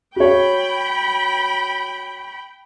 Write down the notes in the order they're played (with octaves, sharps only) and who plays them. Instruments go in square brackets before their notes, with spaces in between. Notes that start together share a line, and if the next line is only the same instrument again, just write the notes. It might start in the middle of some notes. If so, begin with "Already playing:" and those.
[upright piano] F#4 C#5 [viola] G5 B5